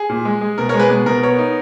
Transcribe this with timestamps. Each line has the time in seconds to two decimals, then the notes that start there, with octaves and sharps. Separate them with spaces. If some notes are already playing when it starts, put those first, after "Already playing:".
Already playing: G#4
0.09 A#2
0.25 G#3
0.41 G#3
0.58 B2 A#4
0.69 G#3 A#4 C#5
0.79 G#4 B4
0.90 B2 G#4
1.06 B2 A#4
1.23 B3 A#4 C#5
1.39 D#4